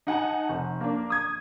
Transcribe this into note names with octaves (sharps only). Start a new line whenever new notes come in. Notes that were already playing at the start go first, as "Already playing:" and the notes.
D#4 F#5 G#5 A5
F1
A#3 D4
D#6 G#6